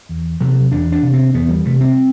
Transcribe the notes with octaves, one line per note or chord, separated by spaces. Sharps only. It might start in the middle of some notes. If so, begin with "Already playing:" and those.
E2
C3 F#3
E2 D4
D4
C3
C4
E2 B3
G3
C3 A3
C4